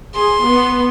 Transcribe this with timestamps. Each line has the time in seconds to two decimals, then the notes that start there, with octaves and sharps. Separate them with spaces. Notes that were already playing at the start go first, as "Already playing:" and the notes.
0.15 G#4 C6
0.46 B3